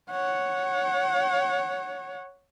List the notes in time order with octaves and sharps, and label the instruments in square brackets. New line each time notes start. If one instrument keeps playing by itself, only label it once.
[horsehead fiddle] C#5 F#5